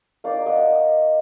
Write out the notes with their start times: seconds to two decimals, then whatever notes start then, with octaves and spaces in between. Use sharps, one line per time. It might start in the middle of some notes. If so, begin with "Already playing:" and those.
0.24 A#3 D#4 D5 F5
0.46 D#5 F#5